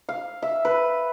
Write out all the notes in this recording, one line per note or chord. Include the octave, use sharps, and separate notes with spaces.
F5
E5
B4